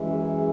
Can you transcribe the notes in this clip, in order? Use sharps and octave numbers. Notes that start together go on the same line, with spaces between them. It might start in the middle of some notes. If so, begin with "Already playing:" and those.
Already playing: F#2 E3 G#3
G#4